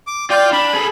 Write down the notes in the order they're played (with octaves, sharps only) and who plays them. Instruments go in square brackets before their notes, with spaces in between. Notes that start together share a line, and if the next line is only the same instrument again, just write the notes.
[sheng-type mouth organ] D6
[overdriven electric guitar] F4 F5 [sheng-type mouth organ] D5 G5
[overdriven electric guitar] D4 [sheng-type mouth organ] B5
[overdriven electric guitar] G#4 A4